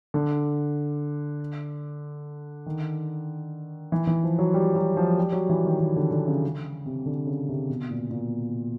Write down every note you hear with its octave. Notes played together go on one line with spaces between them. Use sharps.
D3
D#3
E3
E3
F3
F#3
G3
F#3
F3
G3
F#3
E3
D#3
D#3
D3
D3
C#3
C3
D3
C#3
C3
B2
A#2
A#2